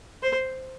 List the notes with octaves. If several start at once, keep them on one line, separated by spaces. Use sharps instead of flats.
C5